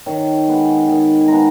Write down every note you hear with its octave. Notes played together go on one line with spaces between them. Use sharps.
D#3 C#5
G#3 B3
D#3 D#5
G#5
G#3 B3 A#5